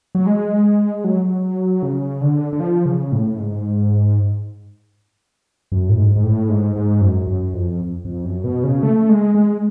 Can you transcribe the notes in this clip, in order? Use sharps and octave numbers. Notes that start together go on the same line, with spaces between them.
F#3
G#3
F#3
C#3
D3
D3
F3
C#3
A2
G#2
F#2
A2
G#2
G#2
A2
G#2
G#2
F#2
F#2
F2
F2
F#2
B2
C#3
A3
G#3
G#3